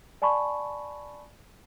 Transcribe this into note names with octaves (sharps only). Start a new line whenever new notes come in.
D5 G#5 A5 B5 C#6